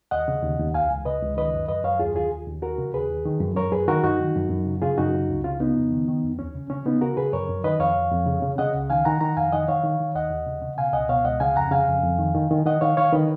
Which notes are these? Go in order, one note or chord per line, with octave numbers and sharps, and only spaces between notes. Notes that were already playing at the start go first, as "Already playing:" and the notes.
D#2 D#5 F#5
C#3
D#2
D#2
C#2 F5 G#5
C#2
C#3 B4 D#5
C#2
D#3 B4 D#5
F#2
F#2 B4 D#5
F#2 C#5 F5
D#2 F4 G#4
D#2 F4 G#4
D#2
D#2
D#2 F#4 A#4
C#3
D#2 G#4 B4
D#2
D#3
F#2
F#2 A#4 C#5
F#2 G#4 B4
D#3 F#4 A#4
F#2 D#4 F#4
D#3
F#2
F#2
C#3
C#3 F4 G#4
F#2 D#4 F#4
C#3
C#2
C#3 C#4 F4
C#3 B3 D#4
F2
D#3
D#3
F2
D#2 C#4
C#3
C#3 C#4
C#3 B3 D#4
C#3 F#4 A#4
C#3 G#4 B4
F#2 A#4 C#5
F#2
D#3 B4 D#5
F2 C#5 F5
F2
F2
C#3
C#3
C#3 D#5 F#5
C#2
D#3 F5 G#5
D#3 F#5 A#5
D#3 F#5 A#5
F2 F5 G#5
D#3 D#5 F#5
D#3 C#5 F5
D#3
D#3
D#2 D#5 F#5
D#2
C#3
C#3
B2 F5 G#5
C#2 D#5 F#5
B2 C#5 F5
C#2 D#5 F#5
C#3 F5 G#5
F2 F#5 A#5
C#3 F5 G#5
F2
F2
D#3
D#3
D#3
D#3 D#5 F#5
D#3 C#5 F5
D#3 C#5 F5
D#3 B4 D#5